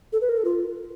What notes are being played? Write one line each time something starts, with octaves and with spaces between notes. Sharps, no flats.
A4
B4
A#4
A4
F4